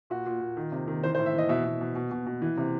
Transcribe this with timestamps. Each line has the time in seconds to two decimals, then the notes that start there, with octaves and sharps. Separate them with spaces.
0.10 A#2 F#4
0.26 A#2
0.41 A#2
0.57 D#3
0.72 C3
0.88 D#3
1.03 E3 C5
1.15 C5
1.19 A2
1.26 E5
1.34 E3 D#5
1.49 B2 E5
1.64 B2
1.81 B2
1.95 B2
2.11 B2
2.26 B2
2.42 E3
2.57 C3